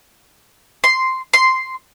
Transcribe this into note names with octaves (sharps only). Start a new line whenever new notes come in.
C6
C6